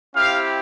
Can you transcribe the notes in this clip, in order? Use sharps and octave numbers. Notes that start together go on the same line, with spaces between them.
C4 E4 G4 F5